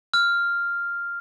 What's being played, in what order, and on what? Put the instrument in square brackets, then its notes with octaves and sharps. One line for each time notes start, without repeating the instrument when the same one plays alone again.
[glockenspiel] F6